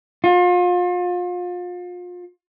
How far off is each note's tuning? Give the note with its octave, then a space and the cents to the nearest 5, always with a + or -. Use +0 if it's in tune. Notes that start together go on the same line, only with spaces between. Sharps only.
F4 +35